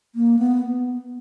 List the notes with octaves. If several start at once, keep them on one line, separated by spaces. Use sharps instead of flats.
A#3
B3